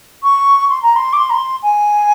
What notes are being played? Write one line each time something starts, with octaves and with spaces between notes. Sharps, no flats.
C#6
C6
A#5
C6
D6
C6
A#5
C6
G#5